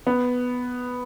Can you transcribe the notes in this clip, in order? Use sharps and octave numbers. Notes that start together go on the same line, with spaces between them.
B3